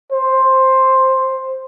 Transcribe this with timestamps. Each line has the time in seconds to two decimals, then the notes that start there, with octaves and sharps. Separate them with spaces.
0.12 C5